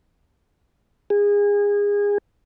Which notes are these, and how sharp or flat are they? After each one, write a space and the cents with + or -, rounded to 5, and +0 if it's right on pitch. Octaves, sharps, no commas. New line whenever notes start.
G#4 -25